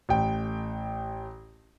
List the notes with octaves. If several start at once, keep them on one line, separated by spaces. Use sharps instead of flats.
A1 G5